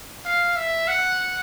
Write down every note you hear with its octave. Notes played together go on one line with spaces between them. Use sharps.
F5
E5
F#5